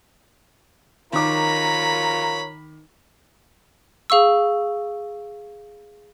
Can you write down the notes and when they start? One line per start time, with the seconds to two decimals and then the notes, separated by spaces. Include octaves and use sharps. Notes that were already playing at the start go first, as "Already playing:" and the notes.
1.13 D#3 F4 A#4 C#5 A#5 B5 D6
4.10 G#4 F5 C#6 E6